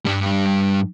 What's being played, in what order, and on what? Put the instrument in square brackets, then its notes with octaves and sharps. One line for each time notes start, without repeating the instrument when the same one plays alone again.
[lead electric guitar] G2 G3